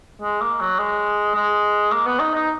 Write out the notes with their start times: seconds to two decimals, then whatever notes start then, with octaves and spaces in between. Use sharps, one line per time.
0.22 G#3
0.41 A#3
0.61 F#3
0.79 G#3
1.35 G#3
1.92 A#3
2.06 B3
2.20 D#4
2.34 D#4